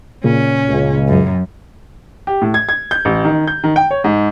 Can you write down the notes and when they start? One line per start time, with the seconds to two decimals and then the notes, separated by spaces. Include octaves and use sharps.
0.24 A#2 C#3 C#4
0.67 C#2
1.08 F#2
2.27 G4
2.42 A2
2.54 G#6
2.69 G#6
2.91 G6
3.05 A1
3.25 D#3
3.47 G6
3.64 D#3
3.76 G5
3.91 C#5
4.04 G#2